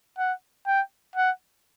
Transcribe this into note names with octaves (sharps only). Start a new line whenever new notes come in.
F#5
G5
F#5